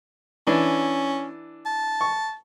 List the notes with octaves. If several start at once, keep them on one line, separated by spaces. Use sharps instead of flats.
E3 C#4 D4
A5
C#6